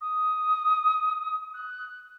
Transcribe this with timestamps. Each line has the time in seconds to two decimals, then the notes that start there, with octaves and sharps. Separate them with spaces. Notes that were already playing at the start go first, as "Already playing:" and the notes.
0.01 D#6
1.54 F#6